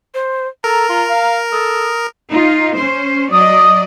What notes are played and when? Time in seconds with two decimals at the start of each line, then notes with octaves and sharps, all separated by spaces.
0.14 C5
0.64 A4 A#4 A#5
0.89 F4
1.09 F5
1.52 A4 D#6
2.31 D#4 F4
2.77 C#4 C5
3.33 F#3 D5 D#5 D#6